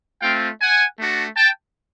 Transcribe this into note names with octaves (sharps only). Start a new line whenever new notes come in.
A3 C4 F4 F5 G5
F#5 G#5
A3 D4 F#4
G5 A5